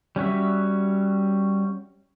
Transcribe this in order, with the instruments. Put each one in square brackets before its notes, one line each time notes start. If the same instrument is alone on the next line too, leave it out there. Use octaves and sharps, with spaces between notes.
[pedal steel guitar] G3 C#4 F#4 E5